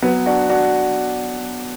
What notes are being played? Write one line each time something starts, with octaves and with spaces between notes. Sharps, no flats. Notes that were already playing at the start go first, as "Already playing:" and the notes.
F#3 B3
D4 F#4
D4 F#4